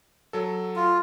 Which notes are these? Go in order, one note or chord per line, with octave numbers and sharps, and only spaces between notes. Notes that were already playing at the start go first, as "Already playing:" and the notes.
F#3 A4
F4